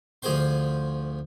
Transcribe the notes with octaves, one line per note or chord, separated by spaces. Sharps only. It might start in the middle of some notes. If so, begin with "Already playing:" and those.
D2 F3 G#4 C5 G5 C6